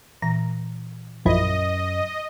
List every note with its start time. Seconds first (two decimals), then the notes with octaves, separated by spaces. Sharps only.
0.22 A#2 E3 A#5
1.25 A#1 F#2 F3 E4 D#5